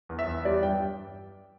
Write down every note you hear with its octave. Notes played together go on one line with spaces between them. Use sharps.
E2
E5
E2
G3 D5
G2 G5